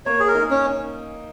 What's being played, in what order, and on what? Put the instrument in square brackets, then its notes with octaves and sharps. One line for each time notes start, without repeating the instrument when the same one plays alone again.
[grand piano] A#3 [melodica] C#5
[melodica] G#4
A#4
[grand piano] D#4
[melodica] C#4